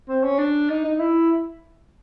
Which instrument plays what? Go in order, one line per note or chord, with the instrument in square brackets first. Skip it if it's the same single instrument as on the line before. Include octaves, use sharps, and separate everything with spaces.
[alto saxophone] C4
C#4
D4
D#4
D#4
E4